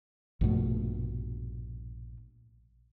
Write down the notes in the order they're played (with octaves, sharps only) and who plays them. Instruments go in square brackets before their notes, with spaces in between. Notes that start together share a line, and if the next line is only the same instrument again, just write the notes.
[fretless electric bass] A#1 G2 B2 A3